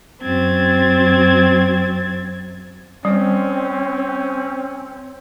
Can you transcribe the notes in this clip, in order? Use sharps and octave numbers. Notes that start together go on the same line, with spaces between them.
F#2 C4 G#6 A6
G3 C4 C#4